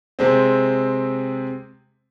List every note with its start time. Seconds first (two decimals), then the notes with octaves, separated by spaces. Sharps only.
0.19 C3 G#3 C4